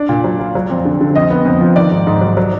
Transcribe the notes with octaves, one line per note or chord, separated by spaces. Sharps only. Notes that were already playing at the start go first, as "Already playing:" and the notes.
Already playing: D4 D5
A#2
F#3
F4
F#3
F2
D3
D3
F2 D#5
B3
F2
F3
D#3 D5
G#2
G#2
F#3
F#3